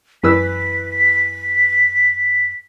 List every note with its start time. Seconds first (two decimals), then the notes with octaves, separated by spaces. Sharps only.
0.24 F#2 E3 B4 E6 B6